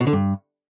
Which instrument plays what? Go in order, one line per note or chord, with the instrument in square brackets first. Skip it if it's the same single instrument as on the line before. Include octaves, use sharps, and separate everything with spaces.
[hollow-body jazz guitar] B2
D3
G2